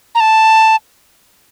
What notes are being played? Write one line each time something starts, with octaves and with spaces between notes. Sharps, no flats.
A#5
A5